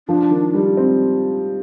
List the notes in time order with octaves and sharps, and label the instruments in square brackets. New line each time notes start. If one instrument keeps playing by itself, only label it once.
[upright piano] F3 [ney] D4
[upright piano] D#3
G3
C4